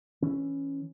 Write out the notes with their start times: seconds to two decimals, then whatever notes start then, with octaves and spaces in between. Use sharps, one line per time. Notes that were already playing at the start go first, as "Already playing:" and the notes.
0.22 E3 C#4